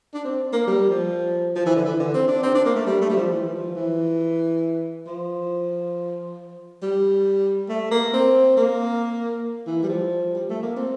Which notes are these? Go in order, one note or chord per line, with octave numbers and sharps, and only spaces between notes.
D4
C4
A#3
G3
F3
F3
E3
D3
E3
D3
C4
D4
C4
D4
A#3
A3
G3
A3
G3
F3
E3
E3
F3
E3
F3
G3
A3
A#3
C4
A#3
E3
G3
F3
G3
A3
A#3
C4